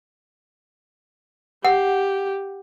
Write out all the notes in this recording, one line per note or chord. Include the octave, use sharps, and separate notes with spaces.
G4 F#5